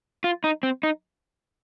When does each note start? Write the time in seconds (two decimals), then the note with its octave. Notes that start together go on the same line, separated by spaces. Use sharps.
0.24 F4
0.44 D#4
0.63 C4
0.83 D#4